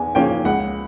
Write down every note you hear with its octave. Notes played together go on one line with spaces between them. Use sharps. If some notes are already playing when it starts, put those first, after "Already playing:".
Already playing: E2 G#5
C#3 F3 A#3 C#4 G5
C#2 F#5